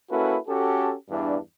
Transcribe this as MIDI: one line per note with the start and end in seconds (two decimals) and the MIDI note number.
0.11 0.37 58
0.11 0.37 61
0.11 0.37 64
0.11 0.37 66
0.11 0.37 69
0.11 0.37 71
0.48 0.94 61
0.48 0.94 66
0.48 0.94 67
0.48 0.94 69
1.10 1.37 40
1.10 1.37 43
1.10 1.37 52
1.10 1.37 62